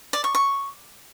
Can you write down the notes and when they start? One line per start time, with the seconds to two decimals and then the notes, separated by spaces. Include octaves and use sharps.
0.13 D5
0.24 C#6
0.35 C#6